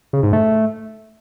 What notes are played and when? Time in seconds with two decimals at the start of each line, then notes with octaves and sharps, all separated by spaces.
0.13 C#3
0.23 G#2
0.33 A3